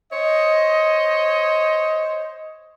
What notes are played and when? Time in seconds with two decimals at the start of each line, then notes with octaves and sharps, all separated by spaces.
0.12 C5 C#5 D#5